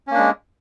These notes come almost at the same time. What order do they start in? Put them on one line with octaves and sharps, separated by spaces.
C#4 A#3 D4 G#3